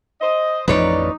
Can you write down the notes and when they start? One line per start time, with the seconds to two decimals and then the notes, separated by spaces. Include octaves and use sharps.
0.21 C5 D#5
0.68 A1 F2 F3 D#4 B4 C#5 D5